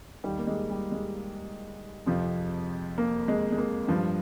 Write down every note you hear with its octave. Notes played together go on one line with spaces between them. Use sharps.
D#2 D#3 G3
A#3
G#3
G3
G#3
F2 C3 F3
A#3
G#3
G#3
A#3
G2 F3